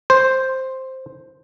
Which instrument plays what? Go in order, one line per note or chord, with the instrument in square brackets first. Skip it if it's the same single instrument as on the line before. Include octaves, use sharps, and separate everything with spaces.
[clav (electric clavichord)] C5